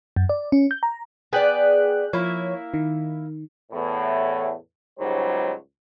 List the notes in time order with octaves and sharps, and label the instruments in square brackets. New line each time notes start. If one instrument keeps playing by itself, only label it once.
[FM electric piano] F#2
D5
C#4
G6
A#5
[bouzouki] B3 D5 [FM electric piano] G#4 G5 F#6
[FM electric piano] F3 C#5 [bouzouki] A#3 E4
[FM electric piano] D#3
[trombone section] E2 A2
C#2 G#2 F#3 G3 C5